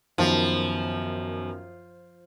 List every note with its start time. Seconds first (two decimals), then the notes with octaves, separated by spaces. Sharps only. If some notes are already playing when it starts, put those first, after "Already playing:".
0.18 F#2 D#3 F3 B3